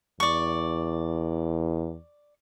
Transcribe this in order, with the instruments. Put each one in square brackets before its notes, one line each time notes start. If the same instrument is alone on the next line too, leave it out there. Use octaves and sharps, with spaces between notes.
[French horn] E2 [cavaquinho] D5 C#6